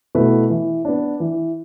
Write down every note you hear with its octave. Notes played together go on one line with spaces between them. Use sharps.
B2 A3 E4 B4
E3
B3 D4
E3